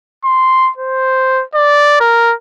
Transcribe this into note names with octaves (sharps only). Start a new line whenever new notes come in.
C6
C5
D5
A#4